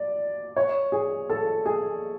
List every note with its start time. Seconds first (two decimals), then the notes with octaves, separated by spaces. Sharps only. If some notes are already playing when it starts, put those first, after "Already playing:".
Already playing: D5
0.56 C#5
0.92 G#4
1.30 A4
1.66 G#4